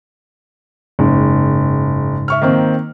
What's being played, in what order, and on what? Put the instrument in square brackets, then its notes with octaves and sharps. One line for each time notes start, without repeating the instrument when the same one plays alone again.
[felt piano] F#1 [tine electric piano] G#2 C#3
[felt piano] E5 C#6 F6
D#3 A#3 C4